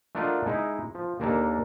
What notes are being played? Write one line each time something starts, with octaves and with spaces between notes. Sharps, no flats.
A3 D4 F4 A#4 D#5 F#5
G#3 D#4 E4
F3
D#2 A#3 D4 A4 A#4 A5